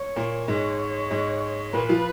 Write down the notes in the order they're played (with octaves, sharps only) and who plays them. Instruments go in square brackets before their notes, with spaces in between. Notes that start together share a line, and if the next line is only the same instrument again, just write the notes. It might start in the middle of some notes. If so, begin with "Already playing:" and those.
Already playing: [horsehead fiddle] C#5
[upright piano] A#2 A#3
[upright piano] G#2 G#3 [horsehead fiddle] C#5
[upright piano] G#2 G#3
[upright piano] A#2 A#3 [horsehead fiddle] B4
[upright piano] F3 F4